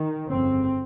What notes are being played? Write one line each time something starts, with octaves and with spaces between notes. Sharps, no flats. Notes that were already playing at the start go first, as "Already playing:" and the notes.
Already playing: D#3
G1 F2 C#3 C4